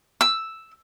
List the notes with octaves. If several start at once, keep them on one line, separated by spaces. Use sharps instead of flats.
E6